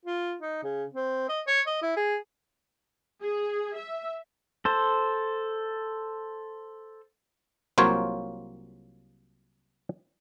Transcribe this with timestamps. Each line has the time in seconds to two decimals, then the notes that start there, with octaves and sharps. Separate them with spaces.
0.05 F4
0.41 D#4
0.64 C#3
0.94 C4
1.29 D#5
1.47 C#5
1.67 D#5
1.82 E4
1.97 G#4
3.22 G#4
3.76 E5
4.65 A4 C5
7.78 C2 F#3 A#3 F4 C5 C#5